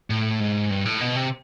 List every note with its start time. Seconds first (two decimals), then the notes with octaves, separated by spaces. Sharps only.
0.10 A2
0.40 G#2
0.70 G2
0.85 A2
1.01 B2
1.16 C3